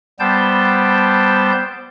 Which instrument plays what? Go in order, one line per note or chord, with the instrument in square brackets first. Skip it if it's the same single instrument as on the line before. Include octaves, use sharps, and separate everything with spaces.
[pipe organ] G3 B3 C5 G5 A5 G6